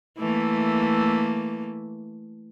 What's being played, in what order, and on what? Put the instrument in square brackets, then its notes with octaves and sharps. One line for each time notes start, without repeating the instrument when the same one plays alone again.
[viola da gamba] E3 A3 A#3